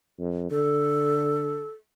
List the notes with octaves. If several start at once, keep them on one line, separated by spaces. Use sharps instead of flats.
F2
D3 A4